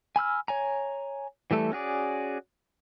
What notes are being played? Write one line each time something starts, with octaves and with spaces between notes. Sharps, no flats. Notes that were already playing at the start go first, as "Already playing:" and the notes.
G#5 B5 E6 F6
C#5 G#5 A#5
E3 G3 A3 A4
C#4 F#4 G#4 D5